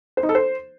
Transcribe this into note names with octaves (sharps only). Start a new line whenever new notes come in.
C5
D#4
A4
C5